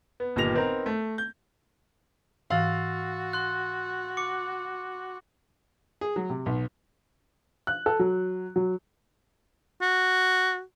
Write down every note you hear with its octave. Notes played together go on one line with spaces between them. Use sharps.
B3
G1 A#2 D#3 G4 A#6 F7
B3 C4 D#4 A#4
A3
G6
G#2 E3 F#4 F5 C6 E6 A6
C6 F#6
D6 C#7
G#4
F#3
C3
B1
F#6
A4
F#3
F#3
F#4